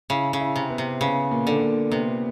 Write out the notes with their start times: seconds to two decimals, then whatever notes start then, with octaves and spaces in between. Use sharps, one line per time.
0.10 C#3 E4
0.33 C#3
0.41 E4
0.56 C3
0.70 B3
0.78 C3
1.01 C#3 B3
1.31 A#2
1.47 D3
1.62 A#2
1.92 C3 B3